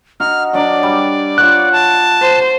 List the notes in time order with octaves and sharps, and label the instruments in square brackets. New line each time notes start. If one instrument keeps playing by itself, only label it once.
[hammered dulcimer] D#4 F#4 [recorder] F6
[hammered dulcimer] F#3 D4 [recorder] D5
[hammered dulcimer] G3
[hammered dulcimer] F4 C#5 F#5 [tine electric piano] F#6
[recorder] A5
[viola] C5